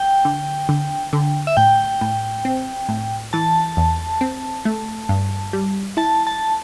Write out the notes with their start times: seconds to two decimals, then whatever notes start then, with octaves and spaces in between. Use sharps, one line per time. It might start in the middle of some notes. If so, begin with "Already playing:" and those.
Already playing: G5
0.25 D3
0.69 D3
1.13 D3
1.47 E5
1.57 A2 G5
2.01 A2
2.45 C4
2.89 A2
3.33 E3 A5
3.77 E2
4.21 C4
4.65 A3
5.09 G2
5.53 G3
5.97 E4 A5
6.27 A5